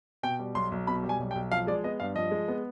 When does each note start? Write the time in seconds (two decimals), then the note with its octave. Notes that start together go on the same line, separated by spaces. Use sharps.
0.23 B2 G5
0.39 G3
0.55 B1 C6
0.72 B1
0.87 B2 B5
1.03 G3
1.09 G#5
1.19 B1
1.31 G5
1.35 B1
1.51 F3 F5
1.67 G#3 D5
1.84 B3 D#5
2.00 G2 F5
2.15 F3 D#5
2.31 G#3
2.48 B3